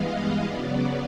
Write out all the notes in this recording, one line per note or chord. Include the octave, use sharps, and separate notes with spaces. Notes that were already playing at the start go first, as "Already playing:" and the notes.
Already playing: G2 E3 G#3 B3 D#5 F5
C#3 F#3 B3 D5